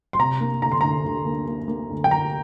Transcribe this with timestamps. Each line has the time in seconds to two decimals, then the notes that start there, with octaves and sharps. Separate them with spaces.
0.13 C6
0.19 C3 A#5
0.41 A#3
0.62 D2 A#5
0.72 C6
0.81 D2 A#5
1.04 D2
1.26 A#3
1.48 A#3
1.68 A#3
1.90 D2
2.04 G5
2.11 D2 A#5